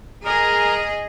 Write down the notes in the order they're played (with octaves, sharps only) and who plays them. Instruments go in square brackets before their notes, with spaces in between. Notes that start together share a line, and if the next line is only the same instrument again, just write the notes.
[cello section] G#4 D#5 [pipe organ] A#4